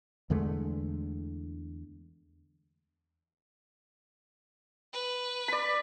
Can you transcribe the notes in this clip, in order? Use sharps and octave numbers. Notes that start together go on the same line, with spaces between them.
E2 D3 G#3 A3
B4
D5 B5